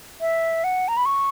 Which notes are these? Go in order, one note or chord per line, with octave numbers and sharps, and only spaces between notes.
E5
F#5
A#5
B5
C#6